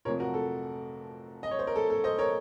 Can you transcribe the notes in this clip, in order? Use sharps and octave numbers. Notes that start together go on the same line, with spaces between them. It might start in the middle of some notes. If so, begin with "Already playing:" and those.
F1 F2 C3 F3 A#4 C#5
F#4 A#4
A4
D#5
C#5
C5
A#4
A4
A4
C5 D#5
A#4 C#5